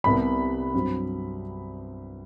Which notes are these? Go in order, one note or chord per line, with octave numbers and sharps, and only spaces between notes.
C2 C3 G3 B3 B5
G2 F#3 C4